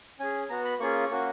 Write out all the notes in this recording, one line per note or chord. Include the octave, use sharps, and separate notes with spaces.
C#4 G#4 G#5
B3 F#4 A#5
B5
A#3 C#4 F4 G#4 C#6
A#3 C#4 F#4